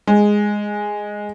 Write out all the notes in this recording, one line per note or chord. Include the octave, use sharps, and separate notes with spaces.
G#3